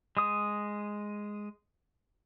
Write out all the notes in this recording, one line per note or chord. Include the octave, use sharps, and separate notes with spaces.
G#3 D#6